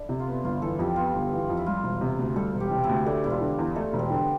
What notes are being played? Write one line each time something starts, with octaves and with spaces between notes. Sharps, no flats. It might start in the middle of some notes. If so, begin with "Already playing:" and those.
Already playing: D4 E4 A4
C3
F4
B3 E4
G1 F4
E3 A4
F2 G4
B3 F4
G1
E3
F2
E4
G3 F4
E1
C3
D2
G3 A4
E1
G4
C3
E4
D2
A3 D4
E1 E4
F4
D3
E2
A3 A4
E1
C4
D3
B3